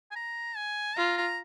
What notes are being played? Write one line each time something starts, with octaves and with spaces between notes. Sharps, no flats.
G#5
A#5
G#5
F4 A#5
A#5